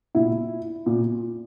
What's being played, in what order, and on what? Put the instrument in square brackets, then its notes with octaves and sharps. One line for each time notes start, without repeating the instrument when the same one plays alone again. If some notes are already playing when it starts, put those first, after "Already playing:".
[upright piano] A#2 E4
A#2